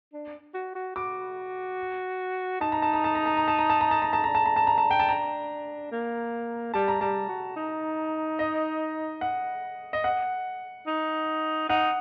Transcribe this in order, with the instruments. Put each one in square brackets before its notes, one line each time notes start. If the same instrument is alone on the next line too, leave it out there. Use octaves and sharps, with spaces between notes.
[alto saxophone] D4
F#4
F#4
[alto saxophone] F#4 [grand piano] D6
[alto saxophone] D#4 [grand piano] A5
[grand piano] A#5
A5
A#5
A5
A#5
A5
A#5
A5
A#5
A5
A#5
A5
A#5
A5
[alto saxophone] D4 [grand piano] A#5
[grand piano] A5
A#5
A5
A#5
A5
G5
A5
A#5
[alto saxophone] A#3
[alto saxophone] G3 [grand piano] A5
[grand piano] A#5
[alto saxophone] G3 [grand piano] A5
[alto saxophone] F#4
D#4
[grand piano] D#5
F#5
D#5
F#5
[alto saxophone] D#4
[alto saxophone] D#4 [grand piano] F#5